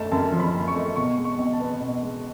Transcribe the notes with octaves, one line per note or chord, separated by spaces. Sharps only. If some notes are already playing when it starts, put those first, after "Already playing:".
Already playing: F#1 A3 A5
F#2 A5
F3
B5
F#1
C#6
A3
B2 C#6
G#3
C#6
B1
A5
B3
B2
G#3